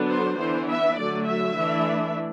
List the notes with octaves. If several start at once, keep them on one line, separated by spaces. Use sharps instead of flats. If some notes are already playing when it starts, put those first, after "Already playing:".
Already playing: D3 F#3 B3 D4
C5
E3 B3 D4 C5
E5
D3 F#3 A3 D5
E5
E3 A3 D4